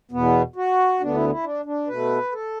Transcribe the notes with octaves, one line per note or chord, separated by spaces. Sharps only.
E2 B2 B3
F#4
D2 D3 B3 D4
E4
E4
D4
D4
B2 A3 B4
A4